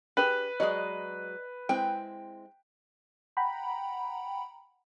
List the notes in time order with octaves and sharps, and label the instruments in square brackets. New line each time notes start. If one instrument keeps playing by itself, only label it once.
[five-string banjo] D4 G4 G#4 [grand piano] B4
[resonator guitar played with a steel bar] F#3 G#3 [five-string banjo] G#4 D5 D#5
[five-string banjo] G#3 C4 E4 [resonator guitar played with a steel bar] G5
[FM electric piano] F#5 G5 A#5 B5